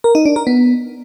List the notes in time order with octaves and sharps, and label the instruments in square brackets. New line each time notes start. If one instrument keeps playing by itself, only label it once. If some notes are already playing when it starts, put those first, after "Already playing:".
[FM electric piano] A#4
D#4
D4
A#4
B3